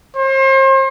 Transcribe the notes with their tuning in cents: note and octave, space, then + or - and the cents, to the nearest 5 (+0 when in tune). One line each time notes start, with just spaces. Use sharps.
C5 +40